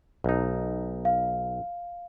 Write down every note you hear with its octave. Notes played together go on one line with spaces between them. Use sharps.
B1 D#4
F5